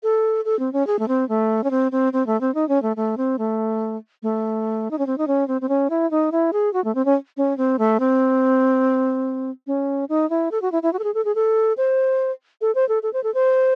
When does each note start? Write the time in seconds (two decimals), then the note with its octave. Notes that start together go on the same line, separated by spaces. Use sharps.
0.03 A4
0.45 A4
0.59 C4
0.73 C#4
0.87 G#4
0.99 A3
1.08 C4
1.29 A3
1.64 C#4
1.71 C4
1.92 C4
2.13 C4
2.27 A3
2.41 C4
2.55 D#4
2.69 C#4
2.82 A3
2.96 A3
3.17 C4
3.39 A3
4.23 A3
4.91 D#4
4.99 C#4
5.07 C4
5.18 D#4
5.27 C#4
5.48 C4
5.61 C4
5.69 C#4
5.90 E4
6.11 D#4
6.32 E4
6.53 G#4
6.73 F#4
6.84 A3
6.95 C4
7.05 C#4
7.37 C#4
7.57 C4
7.79 A3
8.00 C4
9.67 C#4
10.09 D#4
10.30 E4
10.51 A4
10.62 F#4
10.72 E4
10.83 E4
10.93 F#4
10.99 A4
11.04 G#4
11.14 A4
11.25 G#4
11.35 A4
11.77 C5
12.61 A4
12.75 C5
12.89 A4
13.03 A4
13.13 C5
13.24 A4
13.34 C5